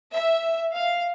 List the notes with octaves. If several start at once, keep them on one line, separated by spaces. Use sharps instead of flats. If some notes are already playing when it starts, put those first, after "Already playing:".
E5
F5